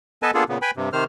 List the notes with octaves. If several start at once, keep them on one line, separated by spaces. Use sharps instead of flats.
B3 A4 B4 D#5 G#5 A5
A#3 B3 D4 F4 G#4 A4
A#2 C#3 B3
B4 G5 G#5 B5
G2 C3
C3 D#3 C5 F6